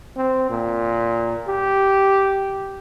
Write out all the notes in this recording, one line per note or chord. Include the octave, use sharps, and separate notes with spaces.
C4
A#2
G4